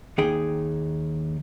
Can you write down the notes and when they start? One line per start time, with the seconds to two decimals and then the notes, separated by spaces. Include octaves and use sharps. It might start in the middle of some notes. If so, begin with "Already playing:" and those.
0.18 D#2 D#4 G#4 G5